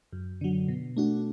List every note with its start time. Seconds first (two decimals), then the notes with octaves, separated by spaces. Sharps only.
0.13 F#2
0.41 D3 F#3
0.68 B2
0.97 A3 D4 F#4